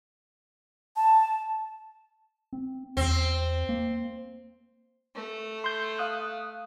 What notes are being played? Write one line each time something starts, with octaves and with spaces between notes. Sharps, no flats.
A5
C4
E2 C4
A#3
A3
C6 G6
F5 D#6 F#6